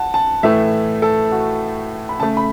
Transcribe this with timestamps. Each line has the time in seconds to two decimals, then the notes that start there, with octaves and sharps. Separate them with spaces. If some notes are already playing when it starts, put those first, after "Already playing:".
Already playing: F#5 A5
0.14 A5
0.43 A2 E3 A3 E5
1.02 A4
1.32 F#4
2.09 B5
2.20 C#3 A3 A5
2.37 B5